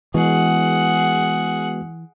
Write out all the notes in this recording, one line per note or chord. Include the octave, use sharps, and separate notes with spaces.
E3 G#3 B3 F#4 G#4 F#5